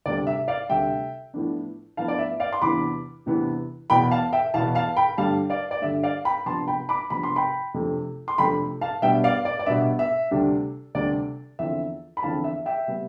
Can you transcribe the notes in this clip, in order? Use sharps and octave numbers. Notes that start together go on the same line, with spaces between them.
D2 C3 G3 D5
E5
D5 F5
D2 C3 G3 E5 G5
A2 F3 B3 D4
A2 F3 B3 D4 F5 A5
D5
E5
D5 F5
C6
E2 C3 E3 B3 D4 B5 D6
E2 C3 E3 B3 D4
E2 B2 B3 G5 B5
F5 A5
E5 G5
E2 B2 B3 F5 A5
F5 A5
G5 B5
G2 D3 G3 F5 A5
D5 F5
D5
G2 D3 G3 E5
D5 F5
G5 B5
C3 F3 B3 D4 A5 C6
G5 B5
B5 D6
C3 F3 B3 D4 B5
C6
G5 B5
F2 C3 F3 A3 D4
C6
F2 C3 F3 A3 D4 G5 B5
F5 A5
B2 G3 B3 D4 E5 G5
D5 F5
D5
D5
B2 G3 B3 D4 E5
E5
D2 C3 G3 D4
D2 C3 G3 D4 D5
E2 D3 F3 C4 E5
B5
E2 D3 F3 C4 F5 A5
E5
E5 G5
C3 G3 B3